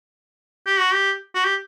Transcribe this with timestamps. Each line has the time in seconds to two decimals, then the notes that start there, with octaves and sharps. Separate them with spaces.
0.66 G4
0.79 F#4
0.93 G4
1.35 F#4
1.44 G4